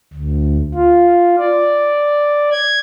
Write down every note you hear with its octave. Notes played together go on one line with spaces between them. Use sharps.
D2
F4
D5
G#6